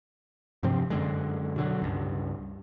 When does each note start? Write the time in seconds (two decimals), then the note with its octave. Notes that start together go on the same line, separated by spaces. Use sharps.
0.63 G2 C3 F3 C4
0.90 F#2 D3 G#3
1.56 B2 D3 F#3
1.82 C#2 G2